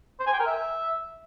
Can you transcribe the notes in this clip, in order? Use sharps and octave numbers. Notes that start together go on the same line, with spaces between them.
C5
G#5
G5
A#4
E5